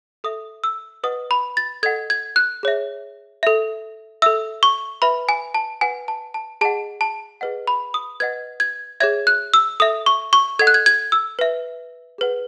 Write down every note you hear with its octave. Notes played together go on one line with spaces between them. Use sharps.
A4 E5 D#6
E6
B4 D#5 F#5 D#6
B5
A6
A4 D#5 F#5 G#6
G#6
F#6
G#4 C#5 E5
A4 E5
A4 E5 E6
C#6
B4 E5 B5
G#5
A5
B4 F#5 G#5
A5
A5
G#4 D#5 F#5 A5
A5
G#4 B4 D#5 F#5
B5
D#6
B4 D#5 F#5 G#6
G#6
G#4 C#5 E5 G#6
F#6
E6
A4 E5 D#6
C#6
C#6
A4 D#5 F#5 G#6
F#6
G#6
G#6
E6
B4 E5
G#4 B4 F#5